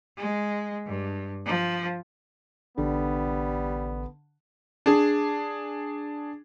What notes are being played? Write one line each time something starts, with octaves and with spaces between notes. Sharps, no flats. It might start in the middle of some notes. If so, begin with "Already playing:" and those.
G#3
G2
F3
A1 D3 G3 B3
D4 G#4